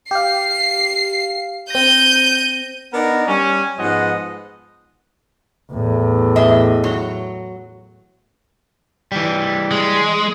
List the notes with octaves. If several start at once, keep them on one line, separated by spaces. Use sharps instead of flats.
G4 F5 C7
C4 G6 A#6 D#7
B3 D4 D#4 A#4
G3 C#4
G#2 F3 B3 D#5 F#5
E2 A2
E3 D#5 E5
F#3
E3 G3
G#3